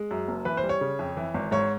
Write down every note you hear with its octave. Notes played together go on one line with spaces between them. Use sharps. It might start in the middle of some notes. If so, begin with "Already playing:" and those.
Already playing: G#3
F#2
F#1
E3 B4
C5
G3
C#5
C#3
F2
E3
G#1
G#2 C#5